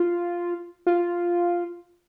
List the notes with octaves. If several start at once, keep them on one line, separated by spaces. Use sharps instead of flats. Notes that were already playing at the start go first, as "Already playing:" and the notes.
Already playing: F4
F4